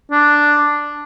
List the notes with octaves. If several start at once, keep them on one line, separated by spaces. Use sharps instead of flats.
D4